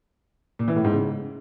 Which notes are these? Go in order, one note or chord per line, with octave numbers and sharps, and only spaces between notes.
A#2
E3
A2
G#2
C#3